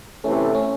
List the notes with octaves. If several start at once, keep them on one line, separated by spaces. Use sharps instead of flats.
C3 E3 A3 C#4
C#4